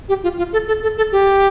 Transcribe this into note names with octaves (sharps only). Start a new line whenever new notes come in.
G4
F4
F4
A4
A4
A4
A4
G4